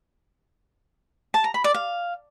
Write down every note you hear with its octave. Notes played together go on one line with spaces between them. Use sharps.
A5
A#5
B5
D5
F5